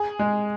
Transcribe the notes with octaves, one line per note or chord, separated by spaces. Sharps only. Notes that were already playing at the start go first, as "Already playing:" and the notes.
Already playing: G#4
G#3